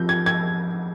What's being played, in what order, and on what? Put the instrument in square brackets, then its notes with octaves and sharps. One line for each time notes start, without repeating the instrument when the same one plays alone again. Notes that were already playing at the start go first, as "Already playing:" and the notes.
Already playing: [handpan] F3 C4 G4 A#4 [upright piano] G6
[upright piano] G#6
G#6